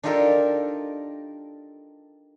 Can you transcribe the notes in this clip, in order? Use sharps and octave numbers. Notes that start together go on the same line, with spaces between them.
D4 D#4 F4 G4 A4 A#4